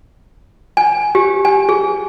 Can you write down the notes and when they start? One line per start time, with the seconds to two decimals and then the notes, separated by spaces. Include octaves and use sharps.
0.77 G#5
1.15 G4
1.45 G#5
1.69 G#4